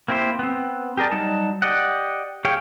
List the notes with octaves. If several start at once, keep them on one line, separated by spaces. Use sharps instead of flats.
A#3 C4 E4 G4 C5
B3 C4
G4 G#4 A#4 D5 A5
F#3 G3 D#4 A5
G4 D5 D#5 F#5
G4 G#4 C#5 F5 G5